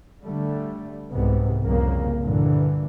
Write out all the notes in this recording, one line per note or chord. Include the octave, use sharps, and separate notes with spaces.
D3 G3 A3
C2 G#2 C3 B3
C2 F2 C#3 A#3
G2 A#2 D3 E3